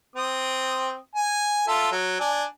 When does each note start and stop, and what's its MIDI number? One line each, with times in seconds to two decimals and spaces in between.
0.16 0.96 60
0.16 0.96 87
1.15 1.64 80
1.68 1.90 65
1.68 1.90 69
1.68 1.90 76
1.92 2.18 54
2.20 2.44 62
2.20 2.44 80